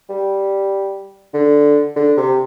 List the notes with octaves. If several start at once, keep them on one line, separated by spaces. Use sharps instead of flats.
G3
D3
D3
C3